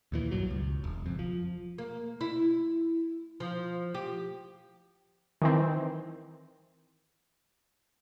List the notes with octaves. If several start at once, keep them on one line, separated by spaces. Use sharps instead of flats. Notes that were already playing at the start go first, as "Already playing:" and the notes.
D#2 A#2 E3
B1 G2 F#3
C#2
E1
F#1 F2
F3
A#3
E4
F3
G4
D#3 E3 C4